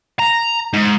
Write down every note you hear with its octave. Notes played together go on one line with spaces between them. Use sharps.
A#5
G#2